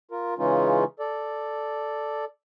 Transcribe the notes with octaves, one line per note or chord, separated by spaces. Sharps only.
F4 A#4
C#3 E3 G#3 C#4 D#4 F4
A4 D5